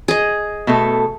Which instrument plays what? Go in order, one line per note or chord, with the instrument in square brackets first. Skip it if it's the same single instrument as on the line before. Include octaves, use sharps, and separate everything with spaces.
[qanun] G#4 D#5
[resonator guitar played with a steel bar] B2 A3 A4